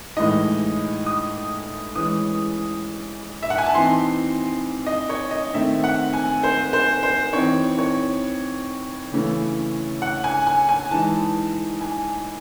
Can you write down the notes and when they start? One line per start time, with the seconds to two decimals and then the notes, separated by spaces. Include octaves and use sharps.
0.16 A2 E3 G#3 D#4 D#5
1.06 D#6
1.95 E3 G#3 C#4 D#6
3.43 E5
3.50 F#5
3.58 G#5
3.66 A5
3.74 E3 C4 D#4 C6
4.86 D#5
5.09 C#5
5.31 D#5
5.53 D#3 A3 C4 D#4 E5
5.84 F#5
6.13 G#5
6.43 C5
6.73 C5
7.03 C5
7.33 E3 C4 D#4 C#5
7.78 C#5
9.12 C#3 E3 A3 C#4
10.02 F#5
10.24 G#5
10.47 G#5
10.69 G#5
10.91 E3 G#3 D#4 A5
11.81 G#5